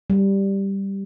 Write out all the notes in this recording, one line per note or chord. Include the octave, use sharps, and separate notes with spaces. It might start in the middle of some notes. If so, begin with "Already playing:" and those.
G3